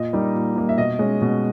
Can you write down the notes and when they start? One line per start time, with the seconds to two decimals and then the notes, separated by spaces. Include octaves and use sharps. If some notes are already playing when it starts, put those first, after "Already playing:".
Already playing: A#2 D#5
0.13 G3 A#3 D#4
0.34 A#2
0.55 G3 A#3 D#4
0.69 E5
0.78 B2 D#5
0.99 G#3 C#4
1.22 B2